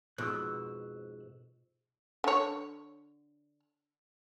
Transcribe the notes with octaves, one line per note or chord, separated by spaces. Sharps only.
F2 G#2 B2 E6 F#6
D3 C#5